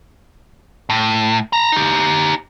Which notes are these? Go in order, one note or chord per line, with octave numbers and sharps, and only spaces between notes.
A2
A5 A#5
D#4 G4